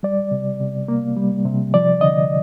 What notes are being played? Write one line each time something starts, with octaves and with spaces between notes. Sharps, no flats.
G3 D5
C3
C3
A#3
G3
C3
F3 D5
D3 D#5